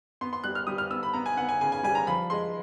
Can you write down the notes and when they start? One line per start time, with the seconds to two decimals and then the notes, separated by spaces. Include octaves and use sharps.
0.21 B3 C6
0.33 C6
0.44 G3 F#6
0.55 F6
0.67 G3 D#6
0.78 F6
0.90 B3 E6
1.03 B5
1.13 B3 A#5
1.26 G#5
1.37 B3 F#5
1.49 G#5
1.61 C#3 G#5
1.72 G#5
1.83 G3 G#5
1.95 A#5
2.07 F3 B5
2.30 G#3 C6